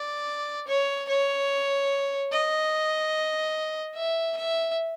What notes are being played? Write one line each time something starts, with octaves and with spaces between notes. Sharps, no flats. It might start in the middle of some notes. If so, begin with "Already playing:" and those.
Already playing: D5
C#5
C#5
D#5
E5
E5